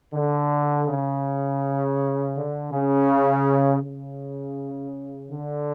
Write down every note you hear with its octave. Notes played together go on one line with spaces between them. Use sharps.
D3
C#3
D3
C#3
C#3
D3